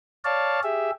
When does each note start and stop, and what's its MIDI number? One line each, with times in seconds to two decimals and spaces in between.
0.25 0.60 73
0.25 0.60 74
0.25 0.60 77
0.25 0.60 81
0.63 0.91 67
0.63 0.91 68
0.63 0.91 76